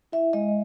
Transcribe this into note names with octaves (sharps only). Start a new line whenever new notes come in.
E4 E5
G#3 D#5